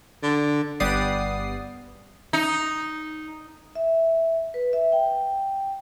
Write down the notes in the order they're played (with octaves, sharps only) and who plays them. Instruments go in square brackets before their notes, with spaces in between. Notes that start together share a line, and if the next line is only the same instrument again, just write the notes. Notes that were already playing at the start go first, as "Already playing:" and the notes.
[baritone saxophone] D3
[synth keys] G1 G3 B3 D5 D#6 C7
[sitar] D#4
[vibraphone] E5
B4
E5
G5